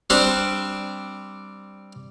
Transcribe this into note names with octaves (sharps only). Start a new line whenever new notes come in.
G3 C4 D4 C5